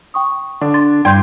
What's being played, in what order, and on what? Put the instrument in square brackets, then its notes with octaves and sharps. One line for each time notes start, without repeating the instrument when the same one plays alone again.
[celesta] G5 C#6 D#6
[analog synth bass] D3 [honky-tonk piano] D4
[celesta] C6 A6
[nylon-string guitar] G2 [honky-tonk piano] G5 C6 [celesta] G6 G#6